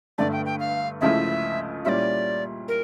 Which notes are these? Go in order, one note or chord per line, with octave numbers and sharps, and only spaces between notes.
G2 D3 A3 D5
G5
G5
F5
C#2 C#3 F3 A3 E4 E5
A#2 G3 C#4 E4 D5 E5
A#4